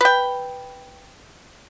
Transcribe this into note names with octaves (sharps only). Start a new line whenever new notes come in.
B4 G5